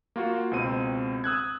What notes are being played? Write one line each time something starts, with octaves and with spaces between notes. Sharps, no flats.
A#3 F4 F#4
C#2 B2 C4 D#7
D#6 E6 F#6 G#6